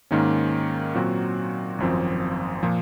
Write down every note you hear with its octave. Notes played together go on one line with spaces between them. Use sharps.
G#2 D#3 A#3 C#4
A#2 F#3 C4 F#4
G#1 F#2 F3 C4
A#2 F3